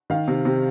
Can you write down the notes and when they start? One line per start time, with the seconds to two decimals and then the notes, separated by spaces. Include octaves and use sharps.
0.10 D#3 F5
0.28 C3
0.45 C3